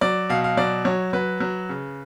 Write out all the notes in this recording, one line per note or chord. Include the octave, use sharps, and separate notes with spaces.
F#3 D5
B2 F5
F5
F#3 D5
F#3 C#5
F#3 B4
F#3
C#3